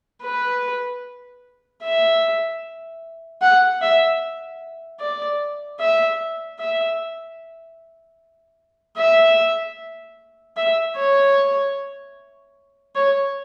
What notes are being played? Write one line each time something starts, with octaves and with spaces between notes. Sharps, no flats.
B4
E5
F#5
E5
D5
E5
E5
E5
E5
C#5
C#5